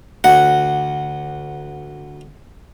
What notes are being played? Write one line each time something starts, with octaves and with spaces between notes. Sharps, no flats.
D2 F#5